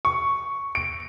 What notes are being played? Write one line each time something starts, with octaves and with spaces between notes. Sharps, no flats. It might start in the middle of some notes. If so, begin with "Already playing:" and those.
C#6
D7